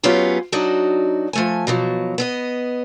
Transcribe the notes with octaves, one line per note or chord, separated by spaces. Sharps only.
F#3 A3 B3 C#4 F4 G4
F#3 D4 D#4 F#4
F3 A3 G#5
B2 F3 F#3
B3 A4 D#5